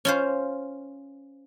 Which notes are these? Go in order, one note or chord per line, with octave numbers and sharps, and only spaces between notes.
C#4 F4 C5